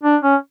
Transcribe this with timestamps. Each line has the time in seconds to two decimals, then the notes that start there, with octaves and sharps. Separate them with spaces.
0.04 D4
0.23 C#4